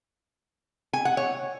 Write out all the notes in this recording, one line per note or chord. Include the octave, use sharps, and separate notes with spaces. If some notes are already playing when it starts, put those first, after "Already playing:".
G#5
F#5
C#5